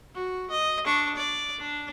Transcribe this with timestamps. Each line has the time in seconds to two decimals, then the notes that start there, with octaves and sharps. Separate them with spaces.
0.15 F#4
0.51 D#5
0.85 D4 C#6
1.16 D5
1.59 D4